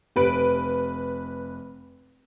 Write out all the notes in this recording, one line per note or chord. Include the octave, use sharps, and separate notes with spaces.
F1 B4 D7